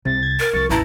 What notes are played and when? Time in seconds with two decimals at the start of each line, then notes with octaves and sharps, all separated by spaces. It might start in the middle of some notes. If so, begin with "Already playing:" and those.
0.05 C2 C3 A6
0.23 G#6
0.39 A#4
0.53 C2 F3 C#6 A6
0.70 A1 D#2 E4 B4 E5 A5 A#5